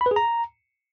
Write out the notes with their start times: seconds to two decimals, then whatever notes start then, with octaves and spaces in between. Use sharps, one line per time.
0.01 B5
0.06 B4
0.11 G#4
0.16 A#5